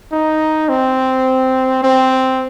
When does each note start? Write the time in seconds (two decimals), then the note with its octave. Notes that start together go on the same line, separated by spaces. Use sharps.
0.12 D#4
0.69 C4
1.83 C4